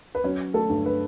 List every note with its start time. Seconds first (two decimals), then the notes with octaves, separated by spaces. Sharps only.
0.15 B4
0.24 F#3 C#4 C#5
0.54 A3 A4
0.70 G2
0.86 B4